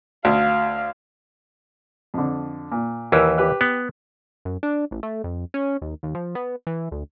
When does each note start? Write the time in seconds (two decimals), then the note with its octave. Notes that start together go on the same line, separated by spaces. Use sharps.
0.25 D2 F5
2.14 F2 D3
2.72 A#2
3.12 D#2 E3 A#4 B4 E6
3.38 G4 B4 F#6
3.61 B3
4.45 F#2
4.63 D4
4.91 A1
5.03 A3
5.24 F2
5.54 C#4
5.82 D#2
6.03 D#2
6.15 F3
6.35 B3
6.67 E3
6.92 D2